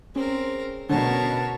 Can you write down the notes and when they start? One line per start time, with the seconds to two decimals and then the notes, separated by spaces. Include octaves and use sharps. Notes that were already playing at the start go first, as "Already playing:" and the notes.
0.15 C4 C#4 G#4 A#4
0.89 B2 D3 A#4 C#5 A5